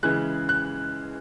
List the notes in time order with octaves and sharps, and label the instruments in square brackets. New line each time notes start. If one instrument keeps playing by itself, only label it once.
[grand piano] C#3 E3 G#3 F#6
F#6